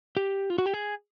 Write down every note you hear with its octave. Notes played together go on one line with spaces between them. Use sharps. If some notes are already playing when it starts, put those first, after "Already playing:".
G4
F4
F#4
G4
G#4